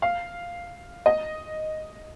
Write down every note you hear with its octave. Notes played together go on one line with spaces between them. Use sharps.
F5
D#5